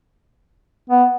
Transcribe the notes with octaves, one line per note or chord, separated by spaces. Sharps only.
B3